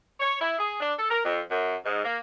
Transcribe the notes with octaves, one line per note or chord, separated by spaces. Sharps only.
C#5
E4
G#4
D4
A4
A#4
F2
F#2
G#2
A#3